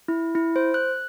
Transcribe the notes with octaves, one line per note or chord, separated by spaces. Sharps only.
E4
E4
C5
F#6